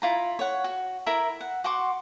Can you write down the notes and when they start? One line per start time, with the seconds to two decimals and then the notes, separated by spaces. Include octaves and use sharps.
0.02 E4 F4 A#5
0.39 C#5 F#5
0.64 F#4
1.06 E4 A#4 E5 B5
1.41 F#5
1.64 F#4 F#5 C6 D6